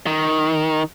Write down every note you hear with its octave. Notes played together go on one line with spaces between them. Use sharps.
D#3